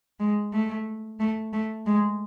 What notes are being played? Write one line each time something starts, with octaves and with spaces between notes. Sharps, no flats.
G#3
A3
A3
A3
G#3